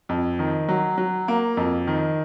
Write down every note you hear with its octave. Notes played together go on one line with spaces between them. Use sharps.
F2
D#3
F#3
F#3
A#3
F2
D#3